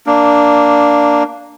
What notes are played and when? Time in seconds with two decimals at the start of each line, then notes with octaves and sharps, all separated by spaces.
0.06 A#3 D4